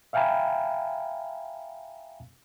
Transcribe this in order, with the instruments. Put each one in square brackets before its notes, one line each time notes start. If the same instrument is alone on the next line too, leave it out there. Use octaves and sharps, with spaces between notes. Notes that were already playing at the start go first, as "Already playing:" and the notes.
[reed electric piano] E5 F5 G5 G#5 A#5 B5